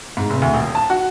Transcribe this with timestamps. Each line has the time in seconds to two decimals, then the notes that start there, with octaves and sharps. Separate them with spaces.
0.17 G#2
0.30 F1
0.42 D2
0.54 D#1
0.75 A5
0.90 F#4